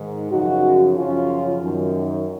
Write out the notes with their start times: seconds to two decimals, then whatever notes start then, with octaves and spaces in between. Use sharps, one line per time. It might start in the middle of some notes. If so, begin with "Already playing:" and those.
Already playing: G#2 D#3
0.31 F#2 C#3 F3 D#4 F#4
0.96 F#2 C#3 F3 C#4 F4
1.62 F#2 D#3